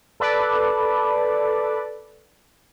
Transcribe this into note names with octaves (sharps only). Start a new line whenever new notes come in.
A4 B4 D5